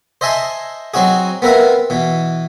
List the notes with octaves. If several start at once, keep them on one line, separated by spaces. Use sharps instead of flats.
C5 D#5 E5 G#5 A5 C6
F#3 C4 D#4 F#4 G#4
B3 C4 A#4 B4 E5 F5
B2 E3